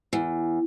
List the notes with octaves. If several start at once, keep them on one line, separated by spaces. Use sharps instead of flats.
E2